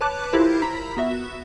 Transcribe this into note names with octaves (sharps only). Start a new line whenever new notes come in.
B4 C#5 A5 D6 F#6
E4 F4 G4 A#4 C5
E4 A#5 B5 B6
B3 F#4 E5